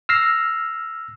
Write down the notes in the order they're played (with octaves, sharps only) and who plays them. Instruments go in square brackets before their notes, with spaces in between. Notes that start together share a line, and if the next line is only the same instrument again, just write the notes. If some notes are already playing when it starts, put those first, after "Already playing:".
[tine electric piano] E6 F6 A#6 C7